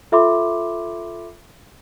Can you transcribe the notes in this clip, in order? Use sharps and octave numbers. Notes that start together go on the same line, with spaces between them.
F4 A4 E5 B5 C6 D6